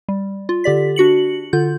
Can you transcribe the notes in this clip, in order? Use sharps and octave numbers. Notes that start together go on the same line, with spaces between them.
G3
F4
D3 G4 D5 B6
D4 F#4 C#7 F#7
D3 F4 G6